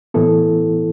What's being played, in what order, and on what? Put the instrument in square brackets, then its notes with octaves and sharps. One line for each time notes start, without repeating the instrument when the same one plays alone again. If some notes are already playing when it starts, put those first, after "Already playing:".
[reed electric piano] A2 E3 B3 E4 A4